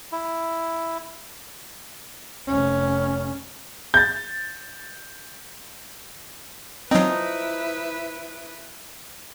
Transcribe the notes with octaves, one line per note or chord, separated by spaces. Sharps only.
E4
F1 C#4
G6 A6
F3 F#3 C4 D#4 E4 B4